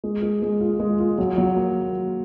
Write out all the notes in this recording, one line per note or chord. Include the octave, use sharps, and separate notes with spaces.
G#3
G#3
G#3
F4
G#3
F4
F#3
F#3
A#3